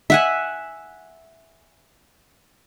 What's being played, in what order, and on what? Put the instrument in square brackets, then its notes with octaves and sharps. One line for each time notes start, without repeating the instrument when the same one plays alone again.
[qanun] E5 F#5 G#5